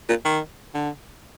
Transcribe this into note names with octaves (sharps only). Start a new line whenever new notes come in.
A#2
D#3
D3